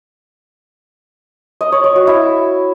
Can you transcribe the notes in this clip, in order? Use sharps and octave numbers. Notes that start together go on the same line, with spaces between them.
D#5
C#5
C#5
F#4
E4